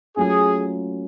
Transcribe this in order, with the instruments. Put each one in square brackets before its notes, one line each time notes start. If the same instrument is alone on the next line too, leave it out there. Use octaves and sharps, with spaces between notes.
[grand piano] F#3 A3 C#4 F4 [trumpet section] G#4